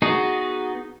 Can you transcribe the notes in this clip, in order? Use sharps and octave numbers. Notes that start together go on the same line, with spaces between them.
B3 D#4 F#4 G#4